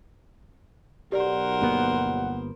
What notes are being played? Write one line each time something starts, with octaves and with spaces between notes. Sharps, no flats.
B1 G4 A#4 C5 D5 F#5
G1 A#3 B3